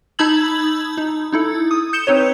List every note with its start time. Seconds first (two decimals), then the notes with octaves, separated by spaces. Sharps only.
0.19 D#4 A5 B5 E6 G#6 F#7
0.97 D#4
1.32 D#4 E4 A4
1.71 D#6
1.93 G6 C#7 E7 G7
2.07 C4 D#4 B4 C#5